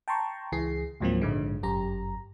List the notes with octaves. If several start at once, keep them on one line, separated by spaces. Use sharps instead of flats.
G5 A5 A#5 C6 C#6
C#2 E3 G#4 C7
C#2 G#2 F3 F#3 A#3 C4
A#1 G#2 D3 G#3
G1 F#2 G4 A#5